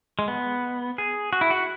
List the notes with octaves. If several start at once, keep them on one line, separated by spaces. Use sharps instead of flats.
G#3
B3
G#4
F#4
E4
F#4